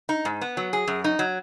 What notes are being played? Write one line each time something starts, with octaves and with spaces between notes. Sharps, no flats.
D#4
G#2
B3
F#3
G#4
F#2
D#4
F#3